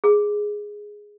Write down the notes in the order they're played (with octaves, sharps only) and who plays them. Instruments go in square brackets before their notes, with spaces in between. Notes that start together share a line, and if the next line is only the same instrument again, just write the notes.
[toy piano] G#4